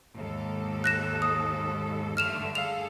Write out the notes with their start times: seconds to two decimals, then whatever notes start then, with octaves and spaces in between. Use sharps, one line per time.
0.16 D#2 G#2 A4
0.84 F#6 A#6 E7
1.22 D#6
2.17 G2 D3 A3 F6 E7 F7
2.55 G#4 A4 F5 F7